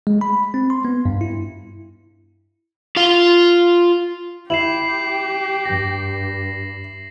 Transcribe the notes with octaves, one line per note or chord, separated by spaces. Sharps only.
G#3
B5
C4
C6
B3
G2
E4
F4 F5
E4 G4 C7 E7 F#7
G2 A#6